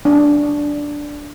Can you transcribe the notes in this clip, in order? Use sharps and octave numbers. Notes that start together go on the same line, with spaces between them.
D4